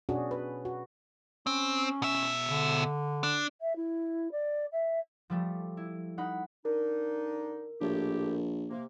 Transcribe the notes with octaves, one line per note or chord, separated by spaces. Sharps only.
B2 C#4 D4 F#4 G#4
B4
F#4
C4 C#4
B2 E5
D3
D4
E5
E4
D5
E5
F3 G3 A3
E4
D#4 F#5 B5
D3 D4 D#4 A#4
A#1 A2 G4
C3 A#3